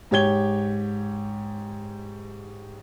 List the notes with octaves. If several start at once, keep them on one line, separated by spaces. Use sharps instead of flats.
G#2 G4 C#5 G#6 G7